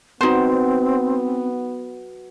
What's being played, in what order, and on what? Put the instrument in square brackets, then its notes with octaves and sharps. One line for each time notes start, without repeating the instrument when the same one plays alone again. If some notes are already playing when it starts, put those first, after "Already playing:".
[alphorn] B3 [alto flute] C4 [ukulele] D#4 C5 [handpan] F#4 B4